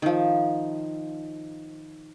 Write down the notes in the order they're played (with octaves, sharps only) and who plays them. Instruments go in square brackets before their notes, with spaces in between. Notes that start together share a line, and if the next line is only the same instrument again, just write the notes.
[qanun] D#3 F3